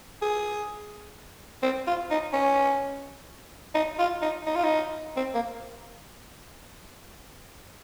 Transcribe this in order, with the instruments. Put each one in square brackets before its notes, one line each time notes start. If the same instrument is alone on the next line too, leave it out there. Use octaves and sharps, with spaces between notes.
[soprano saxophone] G#4
C4
F4
D#4
C#4
D#4
F4
D#4
D#4
F4
D#4
C4
A#3